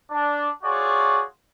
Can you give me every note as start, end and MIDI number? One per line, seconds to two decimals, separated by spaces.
0.11 0.49 62
0.63 1.24 65
0.63 1.24 66
0.63 1.24 68
0.63 1.24 73
0.63 1.24 74